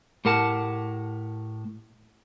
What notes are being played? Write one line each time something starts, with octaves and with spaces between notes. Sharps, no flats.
A2 G4 A#4 F#5 A5